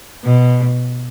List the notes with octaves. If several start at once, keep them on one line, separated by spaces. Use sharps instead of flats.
B2